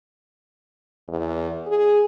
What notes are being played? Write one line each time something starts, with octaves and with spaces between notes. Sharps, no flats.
E2
G#4